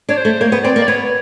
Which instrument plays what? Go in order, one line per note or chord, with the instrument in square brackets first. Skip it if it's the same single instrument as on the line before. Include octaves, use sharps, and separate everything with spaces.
[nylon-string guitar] D4 [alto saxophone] C#5
[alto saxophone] C5
[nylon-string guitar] A3
[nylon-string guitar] A#3 [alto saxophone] C#5
[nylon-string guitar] B3
[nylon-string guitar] C4 [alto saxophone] D5
[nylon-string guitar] A#3
[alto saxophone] D5
[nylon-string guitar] B3 [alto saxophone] C#5